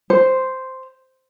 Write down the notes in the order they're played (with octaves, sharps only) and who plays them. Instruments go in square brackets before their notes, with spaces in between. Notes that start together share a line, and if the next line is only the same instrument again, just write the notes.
[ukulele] C5